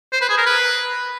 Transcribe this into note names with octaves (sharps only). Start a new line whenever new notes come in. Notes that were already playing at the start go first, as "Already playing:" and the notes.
C5
B4
G#4
A#4
B4